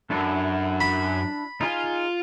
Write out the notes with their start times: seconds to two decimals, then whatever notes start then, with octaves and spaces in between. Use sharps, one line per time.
0.10 F#2 D4 E4 A4
0.81 B5
1.61 D#4 F4 G#4 G#5